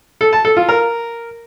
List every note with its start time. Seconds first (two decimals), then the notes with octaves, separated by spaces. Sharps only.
0.21 A4
0.33 A5
0.45 A4
0.57 F4
0.69 A#4